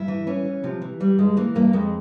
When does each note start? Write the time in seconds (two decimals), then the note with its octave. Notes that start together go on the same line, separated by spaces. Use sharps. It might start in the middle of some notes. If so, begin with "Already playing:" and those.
Already playing: G2 E4
0.08 E3
0.27 E3 C#4
0.45 E3
0.63 C3 F3
0.82 E3
1.00 E3 G3
1.18 G2 G#3
1.37 E3 A#3
1.55 G2 A#3
1.73 F2 G#3